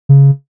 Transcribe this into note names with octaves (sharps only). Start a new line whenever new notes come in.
C#3